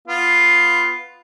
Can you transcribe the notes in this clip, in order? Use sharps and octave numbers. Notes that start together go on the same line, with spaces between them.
B3 F4